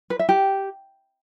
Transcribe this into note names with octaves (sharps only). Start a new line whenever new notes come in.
B4
E5
G4